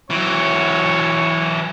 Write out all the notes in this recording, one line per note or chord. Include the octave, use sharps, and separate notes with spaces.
E3 F#3 C#5